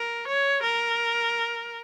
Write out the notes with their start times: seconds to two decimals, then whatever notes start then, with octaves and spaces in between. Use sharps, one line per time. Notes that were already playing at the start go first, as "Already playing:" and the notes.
Already playing: A#4
0.28 C#5
0.63 A#4